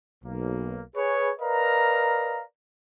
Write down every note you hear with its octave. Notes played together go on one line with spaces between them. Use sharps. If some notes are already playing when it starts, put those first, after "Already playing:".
B1 A#3
G#4 B4 C#5
A#4 B4 D5 D#5 F5 A#5